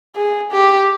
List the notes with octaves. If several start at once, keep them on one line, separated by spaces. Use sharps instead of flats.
G#4
G4